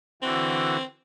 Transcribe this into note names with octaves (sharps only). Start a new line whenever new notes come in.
D3 E3 C4 F#4